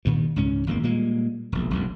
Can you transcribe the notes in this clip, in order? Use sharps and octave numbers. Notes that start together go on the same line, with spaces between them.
G2 A#2 D#3
C#2 G#2 C#4
G#1 E2 C#3 A#3
A#2 G3 G#3 A#3
E1 A#1
E1 B1 F#2